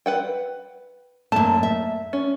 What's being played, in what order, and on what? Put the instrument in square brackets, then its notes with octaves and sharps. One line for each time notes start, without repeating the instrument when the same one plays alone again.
[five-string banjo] B4 F#5 G5
[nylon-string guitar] F#2 A5 [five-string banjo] A3 A#3
[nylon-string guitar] E5
[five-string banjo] C#4